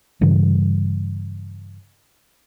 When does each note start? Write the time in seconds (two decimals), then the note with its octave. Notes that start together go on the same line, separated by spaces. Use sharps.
0.21 G2 C#3 E3 G3